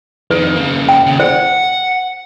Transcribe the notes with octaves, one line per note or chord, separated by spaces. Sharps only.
F2 D#3 B4
C#3 A#3
G5
D#2 C#3
C5 F#5